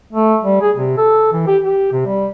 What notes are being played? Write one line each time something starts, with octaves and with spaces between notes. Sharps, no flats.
A3
G3
G#4
C3
A4
E3
G4
G4
C3
G3